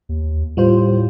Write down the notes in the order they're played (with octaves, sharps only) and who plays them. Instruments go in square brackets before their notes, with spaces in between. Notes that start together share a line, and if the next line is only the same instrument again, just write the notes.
[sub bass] D#2
[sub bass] A2 [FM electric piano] G3 F4 C5